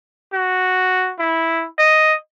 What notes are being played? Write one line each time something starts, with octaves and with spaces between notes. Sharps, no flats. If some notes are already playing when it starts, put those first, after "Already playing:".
F#4
E4
D#5